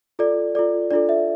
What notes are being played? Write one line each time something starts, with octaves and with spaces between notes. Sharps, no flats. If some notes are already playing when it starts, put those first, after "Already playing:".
F4 A4 D5
F4 A4 D5
D4 F4 A4 D5
E5